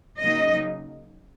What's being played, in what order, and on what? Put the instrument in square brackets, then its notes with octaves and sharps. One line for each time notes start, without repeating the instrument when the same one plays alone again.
[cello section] C#3 F#3 A#3 D#4 D#5